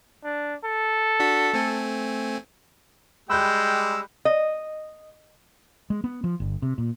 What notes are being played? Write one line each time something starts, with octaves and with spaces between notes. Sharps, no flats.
D4
A4
D4 F#4 B6
A3 C4 G#5
G3 G#3 G5 B5 E6 F#6 G6
D#5
G#3
B3
F3
G1
C3
A#2